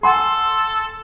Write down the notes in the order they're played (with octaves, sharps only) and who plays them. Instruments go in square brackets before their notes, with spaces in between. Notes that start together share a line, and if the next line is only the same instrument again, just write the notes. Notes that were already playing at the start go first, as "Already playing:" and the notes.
[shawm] A4 [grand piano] F#5 G#5 C6